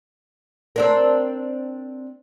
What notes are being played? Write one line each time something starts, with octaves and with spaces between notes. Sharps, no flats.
C4 D4 A#4